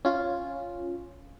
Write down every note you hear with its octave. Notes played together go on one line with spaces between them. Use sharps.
C#4 F4